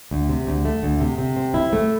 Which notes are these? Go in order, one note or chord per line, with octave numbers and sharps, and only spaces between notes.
D2
C3
D2
A3
D2
C3
C3
C4
E4
A3